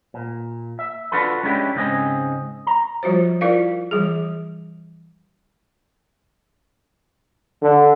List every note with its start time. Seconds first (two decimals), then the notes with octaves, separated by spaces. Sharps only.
0.14 A#2
0.79 E5
1.12 D4 F4 F#4 A4 B4
1.43 G#3 B3 C#4 D4 E4 G4
1.75 G#2 C#3 C4 C#4 D#5 G#5
2.67 A#5
3.03 F3 G3 F4 F#4 C5
3.41 E4 F4 A#4 D5 F5
3.91 E3 G3 G#4
7.62 D3